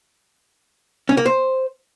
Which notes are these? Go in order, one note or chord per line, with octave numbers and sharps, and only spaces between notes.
C#4
A#3
C5